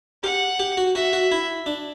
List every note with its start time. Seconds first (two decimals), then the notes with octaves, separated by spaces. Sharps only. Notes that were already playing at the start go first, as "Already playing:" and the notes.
0.23 G4 F#5
0.60 G4
0.77 F#4
0.95 F#4 E5
1.13 F#4
1.32 E4
1.66 D4